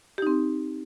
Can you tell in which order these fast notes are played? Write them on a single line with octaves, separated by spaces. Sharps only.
G4 D#4 C4